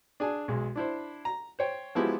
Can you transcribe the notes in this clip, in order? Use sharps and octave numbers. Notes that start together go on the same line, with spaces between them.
D4 G#4 G#5
B1 G#3
D4 E4 C5
A#5
C5 C#5 G5
F3 F#3 G#3 B3 E4 G4